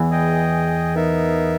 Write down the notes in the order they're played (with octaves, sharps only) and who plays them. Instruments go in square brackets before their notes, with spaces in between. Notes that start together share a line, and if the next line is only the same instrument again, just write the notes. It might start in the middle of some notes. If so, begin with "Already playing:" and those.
Already playing: [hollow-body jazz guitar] E2 E3
[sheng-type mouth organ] G#4 D#5 G5
B3 D#4 A#4 E5